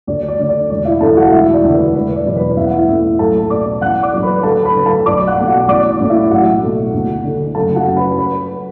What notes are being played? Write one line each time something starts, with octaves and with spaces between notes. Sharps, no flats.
D2 D5
D5
D3 A3
D5
E1 D5
E4 E5
D2 D3 A3 A4 A5
F#4 F#5
E1 E4 E5
D5
D2 D3
B4
E1 B4
D5
E2 B2 F#3
B4
A1 E5
F#5
E4 E5
A2 A3
B1 A4 A5
B2 A3 D5 D6
A1 F#5 F#6
D5 D6
A2 F#3
B4 B5
D2 A4 A5
B4 B5
D3 F#3 A3
A4 A5
B1 D5 D6
F#5 F#6
B2 A3
F#4 F#5
A1 D5 D6
D5
A2 E3 A3
E4 E5
B1 F#4 F#5
B2 A3
D2
D3 A3
F#1 A4 A5
F#4 F#5
F#2 F#3
B4 B5
B4 B5